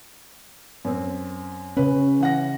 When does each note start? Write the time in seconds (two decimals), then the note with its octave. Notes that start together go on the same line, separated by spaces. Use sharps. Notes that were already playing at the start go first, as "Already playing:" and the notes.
0.85 F#2 C4
1.77 C#3 C#4 B4
2.20 E3 F#5 A#6